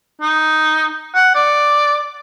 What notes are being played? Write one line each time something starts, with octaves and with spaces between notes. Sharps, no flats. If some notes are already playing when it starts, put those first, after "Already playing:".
D#4
F#5
D5